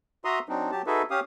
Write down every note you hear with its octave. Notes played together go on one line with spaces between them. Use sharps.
F#4 E5 A#5 C6 D#6
F#3 C4 D4 D#4
F#3 G4 A5
D#4 F#4 G#4 A4 B4 E5
C#4 G4 F5 D#6